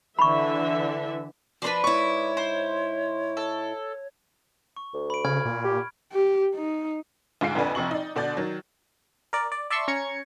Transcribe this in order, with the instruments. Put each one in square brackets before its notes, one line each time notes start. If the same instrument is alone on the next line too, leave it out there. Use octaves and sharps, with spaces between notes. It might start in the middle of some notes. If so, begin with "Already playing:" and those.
[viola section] D3 E3 E5 [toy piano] B5 C#6
[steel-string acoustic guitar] F3 D4 [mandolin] B4 C5 D5
[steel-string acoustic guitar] G#2 E4 [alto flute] C#5 [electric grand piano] C#6
[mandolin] C5
A4
[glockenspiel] C#6
[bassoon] D2
[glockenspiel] B5 D7
[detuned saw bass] C#3 [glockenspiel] B5 F6 G#6
[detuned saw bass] A#2
[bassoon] G4
[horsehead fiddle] G4
D#4
[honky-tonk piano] D2 G#2 F4 C7 D7
A#1 F2 D3 D4 B4 G#5
F1 F2 C3 C#6 F#7
D#4 D5
B2 D3 D4 D5 G6 A6
D#3 F#3
[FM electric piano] A#4 D5
D5
D5 E5 A5 C6 C#6 E6
C#4 A#5 C#6 G#6 C#7